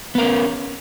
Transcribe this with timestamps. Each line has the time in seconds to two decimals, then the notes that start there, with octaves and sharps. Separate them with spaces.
0.15 B3
0.18 A#4
0.21 C#4